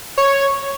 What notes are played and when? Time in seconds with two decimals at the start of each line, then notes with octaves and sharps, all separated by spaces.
0.18 C#5